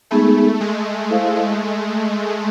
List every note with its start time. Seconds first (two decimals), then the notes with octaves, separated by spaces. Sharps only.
0.11 G#3 A3 B3 D#4 G#4
0.61 G#3
1.10 E4 A4 C5 F5